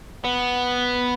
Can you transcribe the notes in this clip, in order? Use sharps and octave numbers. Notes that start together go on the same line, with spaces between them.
B3